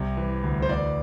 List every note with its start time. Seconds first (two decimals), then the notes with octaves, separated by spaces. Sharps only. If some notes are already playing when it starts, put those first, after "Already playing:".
Already playing: C2 C3
0.17 E3
0.43 D2
0.62 C5
0.69 E3 D5